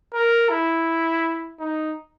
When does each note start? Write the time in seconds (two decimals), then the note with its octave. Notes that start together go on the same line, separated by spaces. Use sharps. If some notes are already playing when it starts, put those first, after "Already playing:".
0.14 A#4
0.50 E4
1.59 D#4